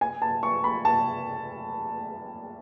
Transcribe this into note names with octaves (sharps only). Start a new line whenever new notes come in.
G#5
A5
C#6
B5
A5